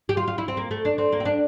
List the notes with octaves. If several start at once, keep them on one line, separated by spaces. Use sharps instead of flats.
G4
F4
F4
E4
C4
A#3
A3
D4
C4
A#3
C4
D4